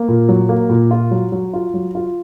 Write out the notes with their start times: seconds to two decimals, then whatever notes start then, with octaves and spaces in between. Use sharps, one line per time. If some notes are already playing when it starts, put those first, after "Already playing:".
Already playing: A#3
0.08 A#2
0.29 F#3
0.49 A#3
0.70 A#2
0.91 F4
1.11 F#3
1.32 F#3
1.54 F4
1.74 F#3
1.95 F4